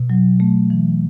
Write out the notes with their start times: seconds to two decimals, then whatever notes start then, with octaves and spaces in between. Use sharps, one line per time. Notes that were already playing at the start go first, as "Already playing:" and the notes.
Already playing: B2
0.10 F#3
0.40 A3
0.70 E3